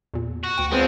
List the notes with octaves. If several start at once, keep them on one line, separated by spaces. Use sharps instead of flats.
E2 A#2
F#4
D2 G5
E2 F3 G#3 C4